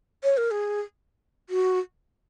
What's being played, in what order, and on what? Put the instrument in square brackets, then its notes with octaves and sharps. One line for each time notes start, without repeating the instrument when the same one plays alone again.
[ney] C#5
A#4
G#4
F#4